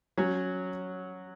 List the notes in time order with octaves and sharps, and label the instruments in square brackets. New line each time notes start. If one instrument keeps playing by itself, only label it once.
[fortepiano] F#3 C#4 F#4